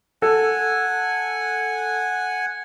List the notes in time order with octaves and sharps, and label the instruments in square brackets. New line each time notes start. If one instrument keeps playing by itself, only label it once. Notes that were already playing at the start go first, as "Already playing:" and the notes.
[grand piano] A4 [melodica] F#5 G#5